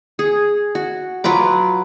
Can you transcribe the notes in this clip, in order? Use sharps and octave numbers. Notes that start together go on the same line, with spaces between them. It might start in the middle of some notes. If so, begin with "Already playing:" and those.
G#4
F#4
F#3 F4 B4 D6